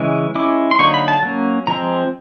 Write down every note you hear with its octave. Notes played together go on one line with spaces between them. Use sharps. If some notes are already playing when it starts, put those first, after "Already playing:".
Already playing: C#3 E3 G#3
G#3 C#4 E4 D6
C6
D3 F#3 A#3 D#4 C#6
B5
A5
F#3 A#3 C#4
F3 G#3 C4 A#5